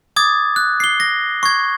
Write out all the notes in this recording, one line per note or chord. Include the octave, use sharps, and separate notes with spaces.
D6 D#6 G#6 A6
F#6
C7 G7
A#6
C#6 G#6